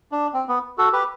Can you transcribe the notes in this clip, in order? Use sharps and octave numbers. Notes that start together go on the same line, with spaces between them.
D4
C4
B3
F#4 A4
G4 B4